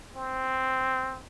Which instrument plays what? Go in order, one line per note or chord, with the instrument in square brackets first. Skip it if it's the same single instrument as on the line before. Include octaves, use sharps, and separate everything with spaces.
[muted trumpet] C4